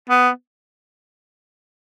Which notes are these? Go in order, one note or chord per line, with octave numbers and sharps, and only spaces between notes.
B3